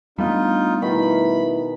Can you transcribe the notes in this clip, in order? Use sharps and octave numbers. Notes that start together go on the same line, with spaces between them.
G3 A3 B3 D4 D#4 F4
B2 D#3 E4 B5